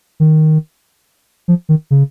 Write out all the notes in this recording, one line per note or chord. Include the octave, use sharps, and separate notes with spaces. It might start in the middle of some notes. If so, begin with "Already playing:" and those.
D#3
F3
D#3
C#3